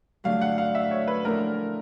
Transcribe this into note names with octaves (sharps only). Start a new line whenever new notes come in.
G2 D3 F#3 A3 D4 F5
F#5
F5
E5
C#5
B4
A2 F3 A3 D4 A#4